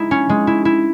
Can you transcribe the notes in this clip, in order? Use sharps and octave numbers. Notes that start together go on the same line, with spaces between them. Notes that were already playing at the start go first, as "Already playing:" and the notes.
Already playing: G#3 D#4 E4
C#4
G#3
E4
E4